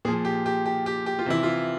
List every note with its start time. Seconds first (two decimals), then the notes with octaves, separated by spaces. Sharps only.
0.05 A#2 G#4
0.08 F3
0.25 G4
0.46 G4
0.66 G4
0.86 G4
1.06 G4
1.19 F4
1.26 C3 E3 E4
1.43 F4